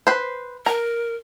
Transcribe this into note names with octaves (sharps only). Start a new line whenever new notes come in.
B4 C5
A#4 A#5